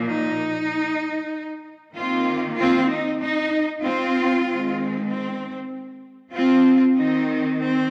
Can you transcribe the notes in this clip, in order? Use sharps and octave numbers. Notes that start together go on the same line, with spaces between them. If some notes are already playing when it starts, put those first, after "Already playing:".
Already playing: A#2 F3 A#3
D#4
D#3 A#3 C4 F4
C4 F4
D#4
D#4
C4 F4
D#3 G#3 C4
C4
C4 F4
D#3 C4 D#4
C4